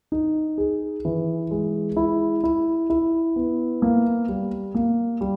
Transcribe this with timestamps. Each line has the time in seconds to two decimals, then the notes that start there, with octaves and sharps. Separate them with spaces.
0.12 D#4
0.58 G#4
1.05 E3
1.51 G#3
1.97 E4
2.44 E4
2.90 E4
3.36 B3
3.82 A#3
4.29 G3
4.75 A#3
5.21 G3